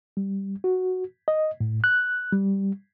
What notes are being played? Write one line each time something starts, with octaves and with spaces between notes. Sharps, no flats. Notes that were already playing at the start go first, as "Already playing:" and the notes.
G3
F#4
D#5
A2
F#6
G3